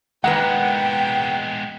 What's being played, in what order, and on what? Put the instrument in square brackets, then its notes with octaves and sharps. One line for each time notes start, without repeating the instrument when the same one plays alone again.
[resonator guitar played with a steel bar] D#3 A#3 B4 [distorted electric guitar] G#3 B3 [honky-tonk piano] F#5 [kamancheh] G5